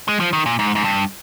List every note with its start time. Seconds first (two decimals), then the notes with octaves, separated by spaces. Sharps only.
0.08 G#3
0.20 F3
0.33 D#3
0.46 A#2
0.59 G#2
0.75 G#2
0.84 G2